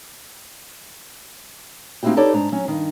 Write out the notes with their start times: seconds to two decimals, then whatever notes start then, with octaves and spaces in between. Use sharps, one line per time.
2.03 A#3 C4 D#4 E4 F#4 G4
2.17 D#4 G4 A4 B4 C#5 D5
2.34 G#2 D4 A#5
2.52 F#3 C#4
2.68 G2 D#3